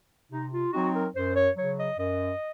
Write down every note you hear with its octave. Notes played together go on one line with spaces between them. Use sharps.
C3 D#4
F4
F#3 C4 D#4 F#4
A#4
F#2 C5
C#5
C#3 F#3 C#5
D#5
F#2 D#5